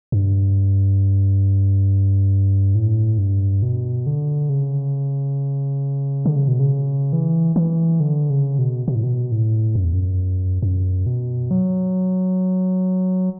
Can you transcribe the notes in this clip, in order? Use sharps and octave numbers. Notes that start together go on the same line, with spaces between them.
G2
A2
G2
B2
D3
C#3
D3
C#3
B2
C#3
E3
E3
D3
C#3
B2
B2
A2
B2
A2
F#2
E2
F#2
F#2
B2
F#3